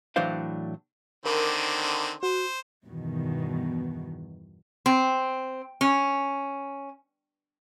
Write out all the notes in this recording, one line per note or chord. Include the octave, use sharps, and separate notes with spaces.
A2 E3 F#3 D4 C5 F5
D3 D#3 C4 A#4 D6
F#4 C5
E2 G2 B2 D#3
C4
C#4